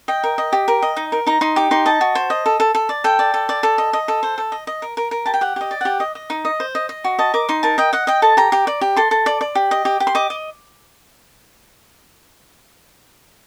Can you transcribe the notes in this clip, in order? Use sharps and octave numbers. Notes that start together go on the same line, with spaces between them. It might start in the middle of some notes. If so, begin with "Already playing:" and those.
D#5 G5
A#4
D#5
G4
A#4
D#5
D#4
A#4
D#4 A#5
D#4 C6
G4 D6
D#4 C6
D#5 A5
F#4
C5
D#5
A4
A4
A4
D5
A4 G5
D5
A4
D5
A4
D#5
D#5
A4
C5
A4
D#5
D#5
A#4
A#4
A#4
G4 A5
G5
G4 F#5
G4 D#5
D5
G4 F#5
D#5
D#5
D#4
D#5
C5
D#5
D#5
F#4
D#5 A5
A#4 D6
D#4 C6
A#4 A5
D#5 G5
D#5 F#5
D#5 G5
A4 A5
G4 A#5
G4
D5
G4
A4 C6
A4
D5
D5
G4
D#5
G4
G4
C6
D#5 D6
D#5